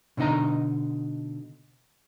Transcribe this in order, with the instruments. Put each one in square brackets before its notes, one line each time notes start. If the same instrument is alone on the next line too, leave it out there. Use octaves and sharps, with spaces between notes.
[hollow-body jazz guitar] B2 D3 D#4 D#5 A#5